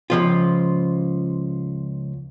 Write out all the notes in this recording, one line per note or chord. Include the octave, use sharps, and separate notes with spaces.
C#2 F3 F4